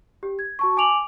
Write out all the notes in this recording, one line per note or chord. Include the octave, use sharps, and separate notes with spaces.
G4
G#6
F#4 A5 C#6
G#5 D6 D7 F7 F#7